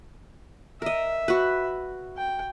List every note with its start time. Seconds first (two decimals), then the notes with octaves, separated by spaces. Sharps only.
0.82 A#4 D#5 E5
1.28 F#4 B4
2.17 G5